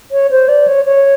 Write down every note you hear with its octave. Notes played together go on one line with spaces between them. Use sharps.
C#5
C5
D5
C#5
C#5